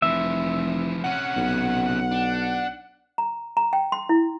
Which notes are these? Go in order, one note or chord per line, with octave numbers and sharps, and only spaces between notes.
F1 E3 F3 E5
C3 C#4 F#5
B1
D4
A#5
A#5
G5
C6
E4